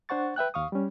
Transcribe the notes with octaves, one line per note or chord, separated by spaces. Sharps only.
D4 C5 F#5 C#6 A6
B4 E5 G5 F#6
D#2 F5 C#6 D#6
G3 C#4